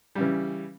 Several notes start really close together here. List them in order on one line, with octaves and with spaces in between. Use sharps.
G3 C#3 E3